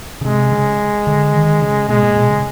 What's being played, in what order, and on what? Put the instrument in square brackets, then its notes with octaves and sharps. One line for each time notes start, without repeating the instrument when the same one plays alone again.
[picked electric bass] C#3
[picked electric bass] C3 [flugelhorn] G#3
[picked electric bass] C#3
D3
D#3
C#3
[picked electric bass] B2 [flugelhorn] G#3
[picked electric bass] A#2
B2
C#3